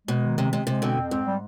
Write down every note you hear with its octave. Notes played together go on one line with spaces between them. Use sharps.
B2 G#3
D#3
C3 G#3
C3 G#3
C3 G#3
B2 D3 C4
F2
G#2 C4
G3